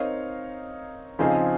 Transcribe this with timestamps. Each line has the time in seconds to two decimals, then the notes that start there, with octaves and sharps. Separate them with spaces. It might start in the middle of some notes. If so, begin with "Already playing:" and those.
Already playing: C4 D#4 A#4 C#5 F5
1.19 C#3 F3 C4 D#4 G#4